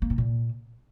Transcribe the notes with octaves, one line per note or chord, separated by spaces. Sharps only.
A#3
A2
A#2